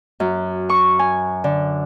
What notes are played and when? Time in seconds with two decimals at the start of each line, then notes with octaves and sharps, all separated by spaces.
0.20 F#2
0.69 C#6
0.99 G#5
1.44 D3